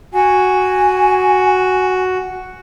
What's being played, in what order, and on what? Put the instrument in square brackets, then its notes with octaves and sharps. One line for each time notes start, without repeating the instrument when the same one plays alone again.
[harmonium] F#4 [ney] G#5